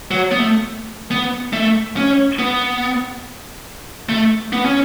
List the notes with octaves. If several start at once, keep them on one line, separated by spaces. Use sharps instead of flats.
F#3
B3
A3
B3
A3
C#4
B3
A3
B3
C#4